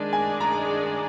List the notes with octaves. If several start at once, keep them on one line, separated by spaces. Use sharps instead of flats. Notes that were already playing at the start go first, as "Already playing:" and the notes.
Already playing: D#3 G#3 D4 G#4 D5
G#5
A#5